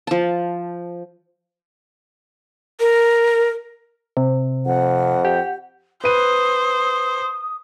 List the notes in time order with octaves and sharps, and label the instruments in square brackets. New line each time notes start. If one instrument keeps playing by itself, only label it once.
[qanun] F3 A5
[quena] A#4
[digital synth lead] C3
[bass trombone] F2 [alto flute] F#5
[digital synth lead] G4
[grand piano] B4 D#7 [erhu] C5 [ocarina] D#6